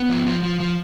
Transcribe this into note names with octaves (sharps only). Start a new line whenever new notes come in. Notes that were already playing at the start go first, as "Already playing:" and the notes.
Already playing: B3
F3
F3
F3
F3